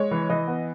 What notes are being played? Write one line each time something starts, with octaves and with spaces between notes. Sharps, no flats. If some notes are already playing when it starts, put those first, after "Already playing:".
Already playing: G#3 C#5
E3
E3 D#5
B3